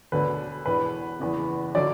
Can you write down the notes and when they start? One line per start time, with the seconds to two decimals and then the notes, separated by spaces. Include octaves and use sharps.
0.12 E1 D2 D3 B4
0.66 E1 E2 E3 D4 B4
1.20 F#1 E2 E3 B3
1.75 D3 F#3 D5